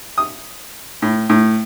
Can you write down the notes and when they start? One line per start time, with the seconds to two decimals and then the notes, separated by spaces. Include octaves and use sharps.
0.18 D#6
1.02 A2
1.30 A2